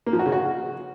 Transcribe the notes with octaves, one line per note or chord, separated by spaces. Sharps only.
A#3
F3
F#4
C#3
F#4